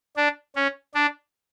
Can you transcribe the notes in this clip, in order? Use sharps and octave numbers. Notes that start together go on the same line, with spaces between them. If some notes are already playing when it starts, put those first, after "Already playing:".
D4
C#4
D4